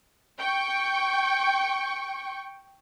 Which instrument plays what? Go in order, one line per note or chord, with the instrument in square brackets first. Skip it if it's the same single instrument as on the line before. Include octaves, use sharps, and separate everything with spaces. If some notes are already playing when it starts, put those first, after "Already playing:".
[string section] G5 C#6